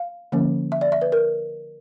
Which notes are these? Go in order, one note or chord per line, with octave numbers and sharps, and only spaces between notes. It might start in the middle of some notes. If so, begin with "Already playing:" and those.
Already playing: F5
D3 F3 A#3 C#4
E5
D5
E5
B4
A#4